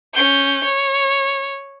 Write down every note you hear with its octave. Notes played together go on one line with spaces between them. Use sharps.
C#4 G6
C#5